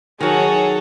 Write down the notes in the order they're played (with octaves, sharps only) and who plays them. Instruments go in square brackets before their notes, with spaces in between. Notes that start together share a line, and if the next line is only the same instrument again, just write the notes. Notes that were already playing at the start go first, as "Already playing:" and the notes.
[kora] D#3 F#3 [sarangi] G#4 [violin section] A4 C#5 F#5